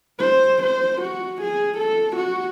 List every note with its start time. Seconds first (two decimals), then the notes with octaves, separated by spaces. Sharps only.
0.19 C5
0.63 C5
1.01 F#4
1.41 G#4
1.77 A4
2.16 F#4